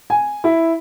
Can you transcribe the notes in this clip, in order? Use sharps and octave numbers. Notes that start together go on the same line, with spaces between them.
G#5
E4